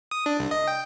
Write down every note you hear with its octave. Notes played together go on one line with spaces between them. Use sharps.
D#6
D4
C2
D#5
G5